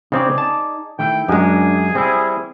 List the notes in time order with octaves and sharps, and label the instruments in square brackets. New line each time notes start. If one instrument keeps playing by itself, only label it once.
[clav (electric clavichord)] C#3 C4 [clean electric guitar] D#4 G#4 D5
[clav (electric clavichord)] A5
[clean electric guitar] D#3 A3 E4 [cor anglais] G5
[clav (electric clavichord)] F#2 G#3 [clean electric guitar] D4 [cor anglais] G#4
[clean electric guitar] G3 E4 [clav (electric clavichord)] C4